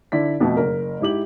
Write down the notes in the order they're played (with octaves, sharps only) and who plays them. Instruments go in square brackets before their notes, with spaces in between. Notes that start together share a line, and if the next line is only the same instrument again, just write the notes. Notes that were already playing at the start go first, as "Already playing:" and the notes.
[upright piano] D3 E4 D5 B6
F2 B2 A3
F#1 A#4
G#2 E4 G4 F#7